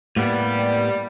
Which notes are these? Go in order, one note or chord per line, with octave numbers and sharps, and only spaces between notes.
A2 G3 A#3 B3